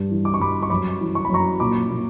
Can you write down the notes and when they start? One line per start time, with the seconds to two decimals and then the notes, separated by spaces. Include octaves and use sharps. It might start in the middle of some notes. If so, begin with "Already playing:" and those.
Already playing: G2
0.10 E3
0.25 D6
0.34 C#6
0.40 G2 B5 D6
0.63 C#6
0.70 F#2 B5 D6
1.01 E3
1.15 C#6
1.25 B5
1.30 F#2 A#5 C#6
1.60 A#2 B5 D6
1.90 A#2